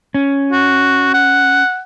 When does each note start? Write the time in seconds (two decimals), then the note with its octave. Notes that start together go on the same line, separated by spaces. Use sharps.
0.14 C#4
0.52 F#4
1.14 F#5